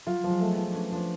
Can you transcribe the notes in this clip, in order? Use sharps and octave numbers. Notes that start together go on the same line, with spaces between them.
F#3 F4
F3
G#3
A3
B3
F3
A3 C#4 D4
F3 D4